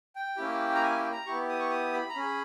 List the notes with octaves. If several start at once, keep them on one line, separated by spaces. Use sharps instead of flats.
G5
A#3 C#4 E4 G4
A#5
G#5
G5
A#5
B3 E4 G4 C#6
D#6
C#6
D#6
B5
A#5
C#4 G#4 B5